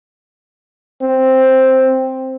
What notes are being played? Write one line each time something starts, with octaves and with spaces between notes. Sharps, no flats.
C4